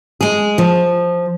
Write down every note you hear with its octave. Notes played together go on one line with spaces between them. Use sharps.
G#3 G#4
F3